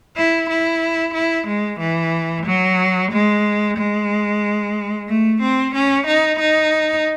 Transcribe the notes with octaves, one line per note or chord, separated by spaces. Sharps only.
E4
E4
E4
G#3
E3
F#3
G#3
G#3
A3
C4
C#4
D#4
D#4